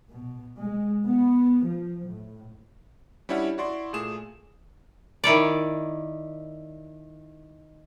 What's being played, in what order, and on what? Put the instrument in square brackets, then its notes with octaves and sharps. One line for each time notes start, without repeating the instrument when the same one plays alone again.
[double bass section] B2
G#3
B3
F3
A2
[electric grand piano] G3 C#4 D4 E4 C#5 F#5
E4 F#4 D5 C6
A#2 A3 G#4 E7
[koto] D#3 E4 C#5 D5